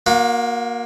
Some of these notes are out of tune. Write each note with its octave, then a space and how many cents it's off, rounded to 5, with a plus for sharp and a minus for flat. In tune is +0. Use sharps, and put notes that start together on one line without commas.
A#3 +10 F#4 -35